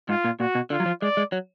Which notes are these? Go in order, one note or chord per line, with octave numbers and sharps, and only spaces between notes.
G#2 F4
A#2
A#2 F#4
B2
D3 F4
F#3
F3
G#3 D5
G#3
F#3